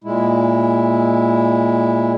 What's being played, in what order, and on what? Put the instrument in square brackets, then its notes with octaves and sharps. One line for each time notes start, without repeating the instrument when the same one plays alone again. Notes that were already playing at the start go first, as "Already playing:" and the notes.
[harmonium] A#2 G#3 E4